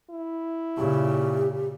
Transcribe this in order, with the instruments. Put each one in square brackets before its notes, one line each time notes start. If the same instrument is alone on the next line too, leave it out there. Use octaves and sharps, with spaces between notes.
[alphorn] E4
[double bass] A#2 C#3 [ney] G4